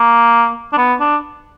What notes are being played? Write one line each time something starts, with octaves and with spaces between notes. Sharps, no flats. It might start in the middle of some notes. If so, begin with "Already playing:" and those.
Already playing: A#3
D4
B3
D4